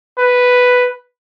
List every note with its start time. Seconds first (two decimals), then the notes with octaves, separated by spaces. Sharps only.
0.18 B4